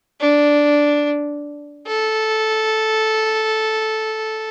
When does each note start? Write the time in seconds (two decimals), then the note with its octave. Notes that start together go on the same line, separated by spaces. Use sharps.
0.20 D4
1.88 A4